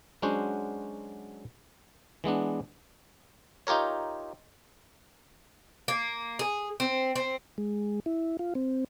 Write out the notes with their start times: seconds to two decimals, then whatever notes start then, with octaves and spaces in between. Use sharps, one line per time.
0.22 F#3 G#3 C#4 D4 F#4 C5
2.24 E3 G#3 B3 D4
3.67 D#4 F4 G4 A#4 C#5
5.88 A#3
6.39 G#4
6.80 C4
7.16 C4
7.58 G#3
8.06 E4
8.39 F4
8.55 C4